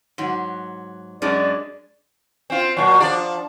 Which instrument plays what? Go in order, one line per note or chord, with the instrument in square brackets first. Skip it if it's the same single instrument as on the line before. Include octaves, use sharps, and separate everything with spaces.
[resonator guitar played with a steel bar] G#2 F#3
[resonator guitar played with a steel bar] F#2 G#3 D4 [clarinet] D5
[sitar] C4 F4
A#2 F#3
F3 D4 D5